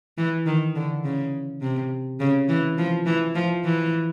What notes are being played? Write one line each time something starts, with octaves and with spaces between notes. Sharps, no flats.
E3
D#3
D3
C#3
C3
C#3
E3
F3
E3
F3
E3